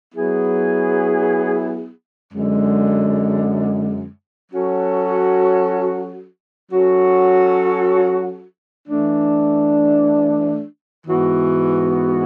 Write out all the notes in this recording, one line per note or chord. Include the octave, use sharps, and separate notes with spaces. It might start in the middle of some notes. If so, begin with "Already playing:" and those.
F#3 B3 E4 G#4
F#2 D3 G#3
F#3 C#4 F#4 A4
F#3 C#4 F#4 A4
E3 A3 D4
G#2 E3 B3 F#4